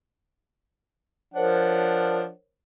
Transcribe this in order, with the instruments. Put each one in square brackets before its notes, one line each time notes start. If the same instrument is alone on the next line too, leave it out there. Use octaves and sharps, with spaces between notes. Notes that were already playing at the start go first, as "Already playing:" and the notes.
[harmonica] F3 D4 F#5 [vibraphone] A#4 C5 C#5